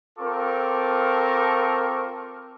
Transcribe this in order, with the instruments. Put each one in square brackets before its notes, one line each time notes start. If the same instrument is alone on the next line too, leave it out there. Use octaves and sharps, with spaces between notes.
[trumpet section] C4 F4 A4 A#4 C#6 D6